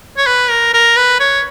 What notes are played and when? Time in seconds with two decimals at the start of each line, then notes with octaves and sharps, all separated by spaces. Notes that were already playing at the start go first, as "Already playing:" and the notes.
0.17 C#5
0.27 B4
0.50 A#4
0.74 A#4
0.97 B4
1.20 C#5